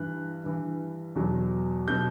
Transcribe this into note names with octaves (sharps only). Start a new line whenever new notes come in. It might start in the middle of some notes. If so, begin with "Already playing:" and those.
Already playing: G2 E3 F#6
G2 E3
E2 B2 F#3
B2 F#3 G6